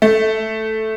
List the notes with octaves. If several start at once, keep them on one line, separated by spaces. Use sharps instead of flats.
A3